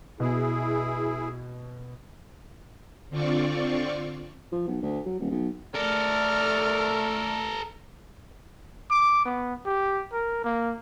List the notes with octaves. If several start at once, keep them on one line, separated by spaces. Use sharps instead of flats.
B2 E4 G#4
D3 C4 F4 D5 C#6
F3
B1
D2
F#3
D#1
B1
A3 A4 A#4 D5 F6
D6
B3
G4
A#4
A#3